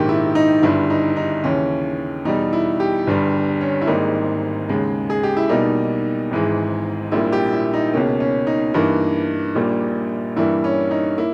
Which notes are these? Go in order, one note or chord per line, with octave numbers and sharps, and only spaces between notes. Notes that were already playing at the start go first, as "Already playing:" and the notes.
Already playing: A#1 G#2 D#3 A#3 G4
E4
D#4
G1 G2 G3 E4
D#4
D#4
D#2 C#3 E3 C#4
E2 B2 G3 D#4
E4
G4
G1 G2 G3
C#4
E4
G#1 G#2 G3 A#3 D#4
D#2 C#3 G#3
G#4
G4
E4
B1 B2 G3 A#3 D#4
G#1 G#2 E3 G#3
A#1 A#2 G3 A#3 E4
G4
E4
D#4
C#2 B2 A#3 C#4
C#4
D#4
G2 E3 A#3
A#1 A#2 G3 A#3
G2 E3 G3 A#3 E4
C#4
D#4
A#3 E4